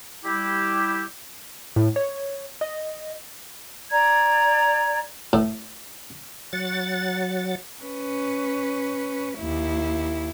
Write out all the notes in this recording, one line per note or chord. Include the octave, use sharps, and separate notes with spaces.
G3 E4 G4
A2
C#5
D#5
D5 A#5 G#6
A2
F#3 F#5 A6
C#4 B4
D#2 E4